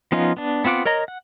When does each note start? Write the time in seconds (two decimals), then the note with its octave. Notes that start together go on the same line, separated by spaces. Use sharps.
0.12 F3 B3 C#4 D#4 F4
0.37 B3 D4
0.64 B3 C4 F4 F#5 D6
0.85 A#4 C#5 D#5 A#5
1.08 F#5